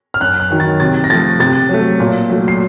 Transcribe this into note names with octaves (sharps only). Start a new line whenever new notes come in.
F6
F#2 F#6
F#6
D#3 F#3
A6
C3 A6
A#6
F3 A3 A6
C3 A6
F#3 A3
A#2
F#3 A3
C7